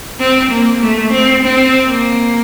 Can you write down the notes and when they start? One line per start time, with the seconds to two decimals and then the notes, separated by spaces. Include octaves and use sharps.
0.20 C4
0.51 A#3
0.82 A3
1.11 C4
1.42 C4
1.87 A#3